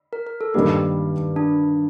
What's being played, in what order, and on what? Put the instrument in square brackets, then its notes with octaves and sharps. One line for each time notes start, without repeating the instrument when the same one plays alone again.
[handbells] A#4
A#4
A4
[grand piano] G2 D#3 G3 A#3 D4 [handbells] G4
[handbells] D4